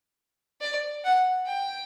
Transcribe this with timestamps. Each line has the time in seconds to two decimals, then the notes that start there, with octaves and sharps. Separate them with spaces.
0.61 D5
1.04 F#5
1.47 G5